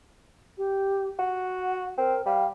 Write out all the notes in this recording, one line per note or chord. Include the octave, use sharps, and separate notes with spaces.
G4
F#4 F#5
C4 A#4
G3 F5